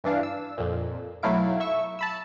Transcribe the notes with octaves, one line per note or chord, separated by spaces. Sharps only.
G2 E3 D4 F5
E6
F2 A#2
B1 F#3 A3 E4 F5 D7
E5 C#6 E6
A5 B5 E6